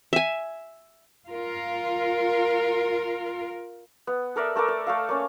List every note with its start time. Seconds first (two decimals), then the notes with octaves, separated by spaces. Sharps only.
0.13 E5 G#5
1.27 F4 A#4
4.07 B3
4.36 A4 A#4 D5 E5
4.56 A3 A4 A#4 D6
4.68 D5
4.87 A3 A4 F5
5.09 A#3 C#4